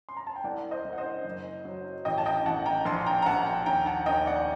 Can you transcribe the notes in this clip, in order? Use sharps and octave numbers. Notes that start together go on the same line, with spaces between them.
C6
A#5
A5
G5
C2 D5 F#5
C5 D#5
C2
F#5
C5 D#5
F#1
F#3
A1 D#5 G5
A5
D#5 G5
A1 F#5 A5
G5 A#5
A#1 A5 C6
C6
G5 A#5
A#5
A#1 F#5 A5
G5 A#5
D#2 G5 A#5
F#5 A5
D#2 D#5 G5
D5 F#5